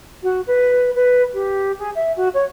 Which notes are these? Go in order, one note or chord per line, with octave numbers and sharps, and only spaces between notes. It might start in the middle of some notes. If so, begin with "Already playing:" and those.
F#4
B4
B4
G4
G#4
E5
F#4
C#5